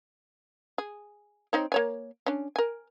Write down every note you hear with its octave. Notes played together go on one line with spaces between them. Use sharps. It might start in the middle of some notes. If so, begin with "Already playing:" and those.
G#4
C4 D#4 C#5
A#3 C#5 G#5
C#4 D4
A#4 G#5